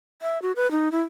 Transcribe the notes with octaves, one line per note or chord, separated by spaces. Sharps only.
E5
F#4
B4
D#4
E4